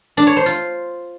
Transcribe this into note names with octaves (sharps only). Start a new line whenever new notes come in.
D4
C#5
C5
F4